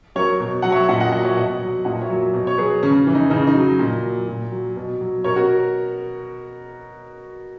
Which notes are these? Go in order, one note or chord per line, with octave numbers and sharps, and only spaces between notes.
F#3 A#4 C#5
B2
F#3 F#5
C#5 E5
A#2 D#5 F#5
D#5 F#5
F#3 D#5 F#5
C#5 E5
B2 D#5 F#5
F#3
A#2 D#5 F#5
C#5 E5
F#3
B2
C#5
F#3 G#4 B4
C#3 C#4
E3
D#4
C#3 D#4
D#4
F#3
A#2
F#3
A#2
F#3
B2
F#3
B2 A#4 C#5
F#4 A#4